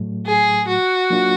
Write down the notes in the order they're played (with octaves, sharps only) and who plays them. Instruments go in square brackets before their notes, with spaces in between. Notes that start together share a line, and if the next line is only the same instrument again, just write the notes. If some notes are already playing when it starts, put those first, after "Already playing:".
Already playing: [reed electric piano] A2 F#3 A3
[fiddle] G#4
F#4
[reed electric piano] F#3 A#3 D4 F4